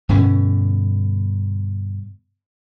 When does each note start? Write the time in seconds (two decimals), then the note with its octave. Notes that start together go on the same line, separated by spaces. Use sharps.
0.09 G2 B2 D3 C#4